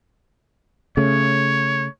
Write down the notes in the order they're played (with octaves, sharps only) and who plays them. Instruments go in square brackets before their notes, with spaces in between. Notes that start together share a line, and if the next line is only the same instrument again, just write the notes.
[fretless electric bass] C#3 A3 [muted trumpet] C#5